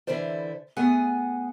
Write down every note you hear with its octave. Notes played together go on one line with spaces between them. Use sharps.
D3 E3 E4 A4 C5 D5
A3 B3 G#4 F#5 G#5